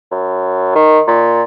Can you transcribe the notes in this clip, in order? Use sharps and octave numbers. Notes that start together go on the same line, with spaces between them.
F#2
D#3
A#2